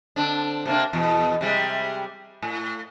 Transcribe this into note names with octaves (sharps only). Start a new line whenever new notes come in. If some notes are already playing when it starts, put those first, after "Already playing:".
D3 C4 D4
C3 A#3 D4
E2 B2
C3 G3 G#3
A2